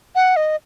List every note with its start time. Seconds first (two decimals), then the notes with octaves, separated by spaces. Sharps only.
0.15 F#5
0.36 D#5